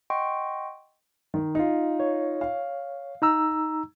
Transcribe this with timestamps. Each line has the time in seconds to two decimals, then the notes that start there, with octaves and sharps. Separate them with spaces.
0.10 D#5 F#5 G5 C6 C#6
1.34 D#3
1.55 D#4 F4
2.00 C#5
2.41 F5
3.22 D#4 A#5 E6